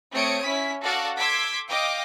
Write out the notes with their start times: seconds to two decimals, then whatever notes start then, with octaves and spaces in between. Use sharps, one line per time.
0.13 A3 C4 C#5 D#6 C#7 D7
0.45 C#4 E4 B6
0.83 F#4 A4 D5 F5 F#5
1.18 C6 D6 E6 G#6 B6 D7
1.69 D#5 F5 G5 D6